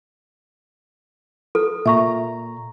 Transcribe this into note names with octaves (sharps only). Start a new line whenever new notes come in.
A4
A#2 E5 A#5 C#6